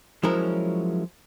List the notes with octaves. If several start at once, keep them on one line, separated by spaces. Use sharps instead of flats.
F3 F#3 G#3 C#4 E4 A#4